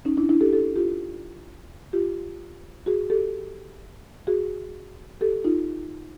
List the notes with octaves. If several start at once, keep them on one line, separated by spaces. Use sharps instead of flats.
C#4 D#4
D4 E4
D4 E4
G4 A4
G4 A4
F4 G4
F4 G4
F#4 G#4
G4 A4
F#4 G#4
G4 A4
D#4 F4